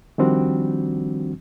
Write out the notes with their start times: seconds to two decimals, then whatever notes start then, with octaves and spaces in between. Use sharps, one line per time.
0.18 D#3 F3 G3 C4 D4 F#4